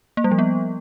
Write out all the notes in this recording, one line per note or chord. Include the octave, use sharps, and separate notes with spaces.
A#3
G3
F3
B3